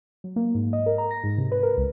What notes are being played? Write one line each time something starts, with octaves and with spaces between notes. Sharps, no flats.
F#3
A#3
G#2
D#5
A#4
A#5
A#6
G#2
C3
B4
A#4
C#2